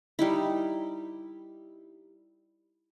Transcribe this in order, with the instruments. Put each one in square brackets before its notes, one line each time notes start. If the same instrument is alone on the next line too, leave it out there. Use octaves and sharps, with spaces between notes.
[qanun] G3 D#4 E4